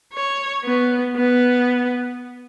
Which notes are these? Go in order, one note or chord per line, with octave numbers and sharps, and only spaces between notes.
C#5
B3
B3